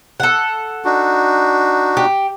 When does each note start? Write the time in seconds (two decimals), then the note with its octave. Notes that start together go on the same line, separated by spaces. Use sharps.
0.20 A4 F#5
0.85 D4 D#4 F#4
1.97 G4